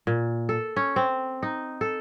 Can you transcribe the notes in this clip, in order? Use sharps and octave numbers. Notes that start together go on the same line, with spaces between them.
A#2
A4
C#4
C4
D#4
A4